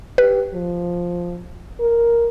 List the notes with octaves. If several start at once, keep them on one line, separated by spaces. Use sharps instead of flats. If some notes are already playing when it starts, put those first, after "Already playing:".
G4 B4
F3
A#4